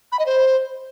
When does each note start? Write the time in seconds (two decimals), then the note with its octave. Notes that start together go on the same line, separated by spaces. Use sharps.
0.12 B5
0.19 D#5
0.26 C5